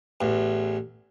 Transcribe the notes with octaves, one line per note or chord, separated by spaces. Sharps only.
A1 E2